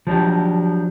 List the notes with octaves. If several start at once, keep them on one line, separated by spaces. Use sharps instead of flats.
F3 F#3 D4 G4